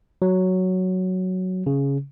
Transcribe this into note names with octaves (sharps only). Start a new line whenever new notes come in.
F#3
C#3